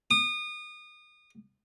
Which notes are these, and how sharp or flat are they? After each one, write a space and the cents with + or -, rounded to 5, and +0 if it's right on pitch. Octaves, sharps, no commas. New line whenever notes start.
D#6 -30